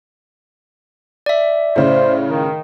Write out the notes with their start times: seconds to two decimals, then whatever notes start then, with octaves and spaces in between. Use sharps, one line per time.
1.26 D5 E5
1.76 A2 C#3 C5
2.28 D#3